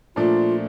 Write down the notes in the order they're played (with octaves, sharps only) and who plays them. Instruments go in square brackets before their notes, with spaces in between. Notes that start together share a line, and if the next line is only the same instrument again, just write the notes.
[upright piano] A#2 F3 A3 D4 [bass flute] F4